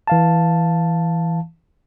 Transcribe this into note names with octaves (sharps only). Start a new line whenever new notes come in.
E3 F5 A5